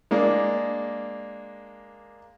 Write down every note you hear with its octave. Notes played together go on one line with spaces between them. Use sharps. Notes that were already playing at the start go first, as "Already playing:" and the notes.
G#3 A#3 D4